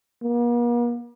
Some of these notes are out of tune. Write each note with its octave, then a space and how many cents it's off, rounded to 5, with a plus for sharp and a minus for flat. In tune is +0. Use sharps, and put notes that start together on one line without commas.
A#3 +45